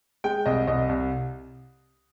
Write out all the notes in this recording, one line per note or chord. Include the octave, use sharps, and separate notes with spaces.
G#3 G5
C2 D#5
C2 D#5
C2